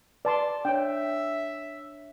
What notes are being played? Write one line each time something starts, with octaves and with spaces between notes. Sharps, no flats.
B4 D5 A5 C6
D4 C#5 E5 G5